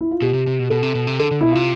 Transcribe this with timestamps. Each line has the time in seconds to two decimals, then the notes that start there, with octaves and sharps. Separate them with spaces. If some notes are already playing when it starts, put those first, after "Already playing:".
0.01 E4
0.11 F4
0.22 B2 G4
0.34 C3
0.47 C3
0.59 B2
0.70 B2 A4
0.83 C3
0.95 B2
1.07 C3
1.19 D3 A4
1.31 D3
1.41 B2 E4
1.52 C3 F4